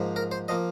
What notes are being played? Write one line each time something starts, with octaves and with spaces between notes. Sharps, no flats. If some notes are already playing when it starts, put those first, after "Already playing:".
Already playing: G#2 F3 A#3
A#4
C5
F3 A#3 D#5